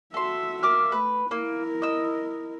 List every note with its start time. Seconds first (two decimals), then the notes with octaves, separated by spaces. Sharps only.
0.14 F#4 A4 E5 C6
0.63 A#3 E5 D6 F6
0.92 A3 B4
1.31 A#3 E4 A#4
1.82 D#5 E6